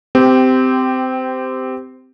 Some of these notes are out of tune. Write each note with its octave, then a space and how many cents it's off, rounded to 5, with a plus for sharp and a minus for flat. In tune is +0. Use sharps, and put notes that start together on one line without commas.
C4 -20 G4 +0